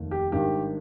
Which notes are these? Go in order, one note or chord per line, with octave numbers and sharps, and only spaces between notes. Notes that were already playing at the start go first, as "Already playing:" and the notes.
Already playing: F1 D#2 D#3
G4
G#1 G2 D#3 G4